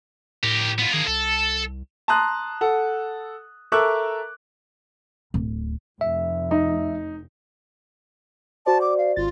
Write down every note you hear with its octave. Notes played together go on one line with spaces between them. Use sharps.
A2 G4 A#4
B3 F4
D#3 A#3 G#4
C2 A4
A5 A#5 C6 D#6 F#6
A4 F#5
A4 A#4 E5 C#6 D6 F#6
D1
F1 E5
D#4
F#4 C5 D5 A5
D6
F5
G#1 F4 A6